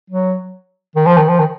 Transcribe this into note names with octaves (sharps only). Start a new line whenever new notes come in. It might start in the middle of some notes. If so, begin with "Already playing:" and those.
F#3
D#3
F3
D#3
F3
D#3